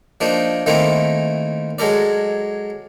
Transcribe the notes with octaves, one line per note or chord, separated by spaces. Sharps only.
F3 A#3 D4 D#4
D#3 A3 A#3 C4 D#4 E4
F#3 G#3 A4 A#4 D5